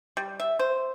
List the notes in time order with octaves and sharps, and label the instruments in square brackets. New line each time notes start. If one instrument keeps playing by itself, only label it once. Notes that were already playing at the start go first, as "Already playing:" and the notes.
[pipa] G3
E5
C5